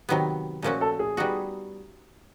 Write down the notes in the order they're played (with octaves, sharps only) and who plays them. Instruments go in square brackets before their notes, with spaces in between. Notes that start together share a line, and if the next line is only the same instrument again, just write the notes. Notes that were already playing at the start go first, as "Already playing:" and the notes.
[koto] C3 D#3 F#3 B3
[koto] A#2 F3 A3 C#4 F#4 [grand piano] A#4
[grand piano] A4
G#4
[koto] G3 B3 D#4 F#4